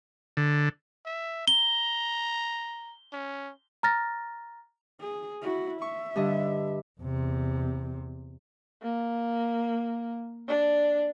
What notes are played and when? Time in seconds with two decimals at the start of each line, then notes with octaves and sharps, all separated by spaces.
0.37 D3
1.06 E5
1.48 A#5 G7
3.13 C#4
3.83 A#5 F6 A6 A#6
5.00 G#4
5.42 E4 F#4
5.82 E5 C#6
6.16 G2 D3 D#5
7.01 E2 C3
8.82 A#3
10.48 D4